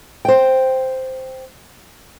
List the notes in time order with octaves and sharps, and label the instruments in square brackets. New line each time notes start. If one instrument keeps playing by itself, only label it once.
[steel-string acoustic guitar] C5 G5